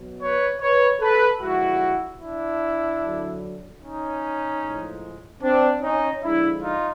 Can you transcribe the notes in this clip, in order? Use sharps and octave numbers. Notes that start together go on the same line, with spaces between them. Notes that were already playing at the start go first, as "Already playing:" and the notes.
Already playing: B2 F#3
B4 C#5
B4 C#5
A4 B4
D3 F3 G#3 E4 F#4
D4 E4
D3 F#3
C#4 D#4
A2 F3 G#3
C4 D4
C#4 D#4
D3 F3 G#3 D4 E4
D#4 F4